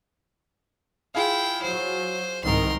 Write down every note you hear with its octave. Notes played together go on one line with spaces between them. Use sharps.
E4 F4 G#4 F5 G5
F#3 C5
C2 G#2 D#3 A#4 C6